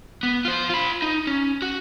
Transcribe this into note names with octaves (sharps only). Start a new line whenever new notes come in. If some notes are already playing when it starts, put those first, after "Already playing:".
B3
F4 C5
F4 B5
D#4
C#4
F#4